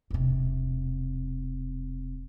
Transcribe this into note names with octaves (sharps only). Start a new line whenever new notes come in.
E1 C3